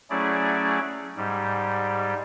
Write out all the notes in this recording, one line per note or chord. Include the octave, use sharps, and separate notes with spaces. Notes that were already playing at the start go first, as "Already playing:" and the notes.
F#3 A3 C#4 E4 G#4 D5
G#2 G3